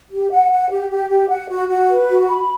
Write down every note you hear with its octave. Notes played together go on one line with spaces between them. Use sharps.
G4
F#5
F#5
G4
G4
G4
F#5
F#4
F#4
B4
F#4
B5